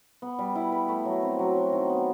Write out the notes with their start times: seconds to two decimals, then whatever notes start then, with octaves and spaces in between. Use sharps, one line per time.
0.22 B3
0.39 G3
0.55 E4
0.72 B4
0.89 A3
1.05 F#3
1.23 C4
1.39 F#3
1.55 F#3
1.72 D#3
1.89 B3